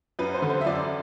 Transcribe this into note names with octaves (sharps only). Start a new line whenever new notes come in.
F#2 B4
C5
D3
C5
E5
F#2 D5